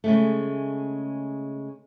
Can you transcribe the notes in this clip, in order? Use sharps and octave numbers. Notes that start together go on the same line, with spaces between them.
C#3 G#3 A3